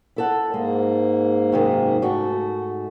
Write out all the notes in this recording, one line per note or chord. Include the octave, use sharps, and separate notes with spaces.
E4 A4 F#5
G#2 G#3 A#3
F#2 C3 D#3
G#2 A3 F#4